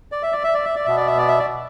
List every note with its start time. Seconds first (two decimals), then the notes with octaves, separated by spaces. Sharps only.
0.12 D5
0.23 E5
0.33 D5
0.43 E5
0.55 D5
0.65 E5
0.76 D5
0.85 B2 B3 E5
0.97 D5
1.07 E5
1.18 D5
1.28 E5
1.39 D5